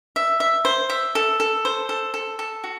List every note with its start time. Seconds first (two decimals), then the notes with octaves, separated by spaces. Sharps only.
0.16 E5
0.40 E5
0.65 C5
0.90 E5
1.15 A4
1.40 A4
1.65 C5
1.89 A4
2.14 A4
2.39 A4
2.64 F#4